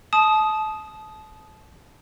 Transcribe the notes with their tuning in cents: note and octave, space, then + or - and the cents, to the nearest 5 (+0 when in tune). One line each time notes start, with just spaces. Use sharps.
A5 -30 D#6 +0